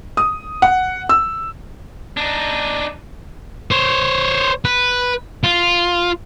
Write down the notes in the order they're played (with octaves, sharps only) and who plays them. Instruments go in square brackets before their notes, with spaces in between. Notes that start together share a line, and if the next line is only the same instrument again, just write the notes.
[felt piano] D#6
F#5
E6
[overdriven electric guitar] D4 D#4
[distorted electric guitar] C5 C#5
B4
F4